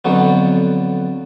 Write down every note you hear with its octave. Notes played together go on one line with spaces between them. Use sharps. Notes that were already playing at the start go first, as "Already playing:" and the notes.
F2 D3 F#3 B3